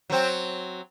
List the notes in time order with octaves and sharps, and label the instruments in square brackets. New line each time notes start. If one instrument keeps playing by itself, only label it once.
[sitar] F#3 C4